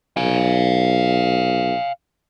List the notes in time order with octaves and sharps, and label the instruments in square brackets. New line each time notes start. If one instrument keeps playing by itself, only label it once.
[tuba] B1 [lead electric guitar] F5 G#5